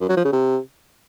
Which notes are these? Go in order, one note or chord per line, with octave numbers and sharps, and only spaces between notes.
F#2
F#3
F3
C#3
C3